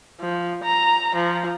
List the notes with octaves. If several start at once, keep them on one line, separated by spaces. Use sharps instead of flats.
F3
A#5
F3